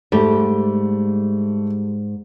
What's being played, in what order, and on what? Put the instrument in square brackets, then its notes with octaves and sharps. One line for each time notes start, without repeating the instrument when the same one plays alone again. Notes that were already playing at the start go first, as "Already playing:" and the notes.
[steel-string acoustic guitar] G#2 [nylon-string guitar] G3 [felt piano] A3